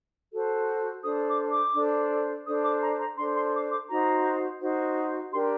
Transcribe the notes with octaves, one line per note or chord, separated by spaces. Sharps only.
F#4 A4 C5
D4 A4 C5 D#6
D6
D6
D4 A4 C5
D4 A4 C5 D#6
D6
A#5
A#5
D4 A4 C5 C6
C6
D6
D6
D#4 F#4 C5 A#5
D#4 F#4 C5
D4 G4 A#4 C6